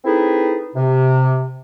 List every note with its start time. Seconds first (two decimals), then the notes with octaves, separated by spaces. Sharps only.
0.05 C4 D#4 E4 G#4 A4 B4
0.75 C3